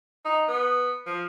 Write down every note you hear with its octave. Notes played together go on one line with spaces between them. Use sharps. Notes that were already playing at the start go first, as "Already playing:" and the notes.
D#4
B3
F3